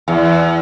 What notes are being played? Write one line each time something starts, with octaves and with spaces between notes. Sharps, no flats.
E2